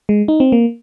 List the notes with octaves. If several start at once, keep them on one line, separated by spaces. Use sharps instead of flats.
G#3
D#4
C4
A#3